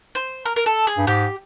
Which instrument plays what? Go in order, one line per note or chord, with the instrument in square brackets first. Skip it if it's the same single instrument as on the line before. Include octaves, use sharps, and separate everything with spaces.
[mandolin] C5
A#4
A#4
A4
G#4
[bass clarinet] G2
[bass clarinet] G#2 [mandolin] G4